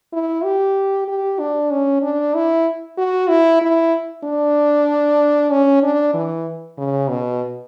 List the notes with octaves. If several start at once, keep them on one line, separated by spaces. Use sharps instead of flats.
E4
G4
G4
D4
C#4
D4
E4
F#4
E4
E4
D4
C#4
D4
E3
C#3
B2